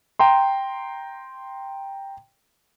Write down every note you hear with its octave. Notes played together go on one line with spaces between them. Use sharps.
G5 A#5 C6